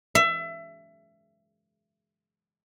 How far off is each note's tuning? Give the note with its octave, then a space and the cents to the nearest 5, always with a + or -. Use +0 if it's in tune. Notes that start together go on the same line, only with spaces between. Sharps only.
E5 +25